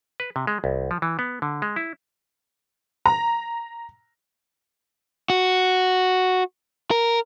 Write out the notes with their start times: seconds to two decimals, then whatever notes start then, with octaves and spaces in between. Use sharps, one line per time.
0.20 B4
0.36 C3
0.47 G#3
0.64 C2
0.91 F3
1.02 E3
1.19 B3
1.42 D3
1.62 G#3
1.76 E4
3.06 A#5
5.30 F#4
6.91 A#4